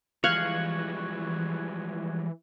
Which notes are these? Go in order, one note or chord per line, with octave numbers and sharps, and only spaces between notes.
E3 F3 G3 G#3 F5 C#6 F#6 G#6